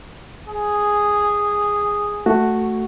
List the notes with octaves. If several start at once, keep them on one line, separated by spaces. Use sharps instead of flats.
G#4
A3 F#4